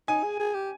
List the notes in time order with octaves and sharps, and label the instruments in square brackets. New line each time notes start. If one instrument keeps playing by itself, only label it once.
[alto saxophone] D#4 [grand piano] G#5
[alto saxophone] G#4
G#4
G4